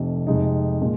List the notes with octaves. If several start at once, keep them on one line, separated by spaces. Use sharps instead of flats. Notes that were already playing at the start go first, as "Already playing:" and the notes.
Already playing: F1 F2 C3
F2 C3 G#3 D#4
A#2 G#3